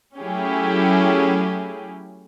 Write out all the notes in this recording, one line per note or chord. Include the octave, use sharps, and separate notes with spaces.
F#3 A3 C#4 E4 G4 G#4